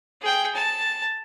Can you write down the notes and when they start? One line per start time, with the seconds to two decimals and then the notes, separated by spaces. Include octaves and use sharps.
0.21 G#4 G5
0.55 A5